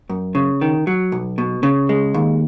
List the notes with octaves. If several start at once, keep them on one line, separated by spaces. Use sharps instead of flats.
F#2
C#3
D#3
F#3
B1
B2
C#3
G#3
D#2